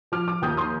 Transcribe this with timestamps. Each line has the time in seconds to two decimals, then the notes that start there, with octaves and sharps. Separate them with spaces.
0.12 F3 D6 F6
0.28 D6 F6
0.42 D#2 D#6 G6
0.57 C6 D#6